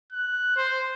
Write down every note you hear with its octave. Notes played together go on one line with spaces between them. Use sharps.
F#6
C5